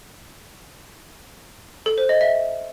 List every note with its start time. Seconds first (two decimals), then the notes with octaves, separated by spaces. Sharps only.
1.86 A4
1.98 C5
2.09 D#5
2.21 E5